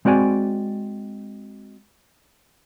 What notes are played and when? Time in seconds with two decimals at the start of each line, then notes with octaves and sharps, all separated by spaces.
0.05 G#3 C4 F#4 D5 G#5